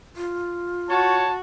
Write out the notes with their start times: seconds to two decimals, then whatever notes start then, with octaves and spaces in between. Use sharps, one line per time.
0.16 F4
0.90 F#4 C#5 A5